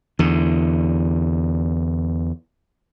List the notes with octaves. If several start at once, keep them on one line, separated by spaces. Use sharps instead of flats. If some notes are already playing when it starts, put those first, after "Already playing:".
E2 D3